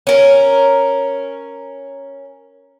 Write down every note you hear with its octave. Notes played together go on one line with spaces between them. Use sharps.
C#4 A#4